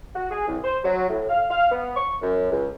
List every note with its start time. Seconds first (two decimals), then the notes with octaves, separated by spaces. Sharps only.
0.15 F#4
0.31 G#4
0.48 C2
0.63 C5
0.84 F#3
1.09 A2
1.29 F5
1.50 F5
1.72 B3
1.96 C#6
2.22 F#2
2.50 C#2